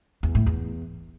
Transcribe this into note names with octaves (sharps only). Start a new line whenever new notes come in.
E2
A2
E2